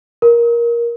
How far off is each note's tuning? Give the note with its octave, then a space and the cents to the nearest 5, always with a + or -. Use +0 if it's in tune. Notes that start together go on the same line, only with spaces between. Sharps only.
A#4 +15